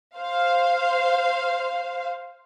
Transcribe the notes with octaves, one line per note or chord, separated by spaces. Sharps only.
C5 F5